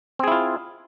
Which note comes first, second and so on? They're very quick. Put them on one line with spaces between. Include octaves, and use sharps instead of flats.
C4 G#4 E4 F4